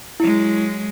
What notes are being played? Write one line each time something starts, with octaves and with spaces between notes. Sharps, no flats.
F#3 G#3 E4